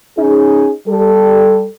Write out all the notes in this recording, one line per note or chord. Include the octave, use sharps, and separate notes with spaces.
C#4 D#4 G#4
G3 A4